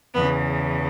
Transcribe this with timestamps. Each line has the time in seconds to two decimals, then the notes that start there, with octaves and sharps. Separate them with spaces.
0.14 E2 C#3 E3 B3